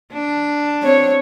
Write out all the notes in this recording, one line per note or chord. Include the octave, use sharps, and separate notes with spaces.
D4
C4 C#5